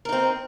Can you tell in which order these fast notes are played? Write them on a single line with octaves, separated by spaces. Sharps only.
A#4 D#4 C4